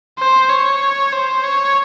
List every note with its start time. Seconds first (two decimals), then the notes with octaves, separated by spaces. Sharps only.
0.19 C5
0.50 C#5
1.12 C5
1.44 C#5